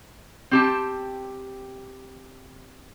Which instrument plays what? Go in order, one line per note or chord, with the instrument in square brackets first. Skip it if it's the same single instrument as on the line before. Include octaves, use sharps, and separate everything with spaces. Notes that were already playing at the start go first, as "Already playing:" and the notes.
[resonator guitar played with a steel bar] C4 G4 A5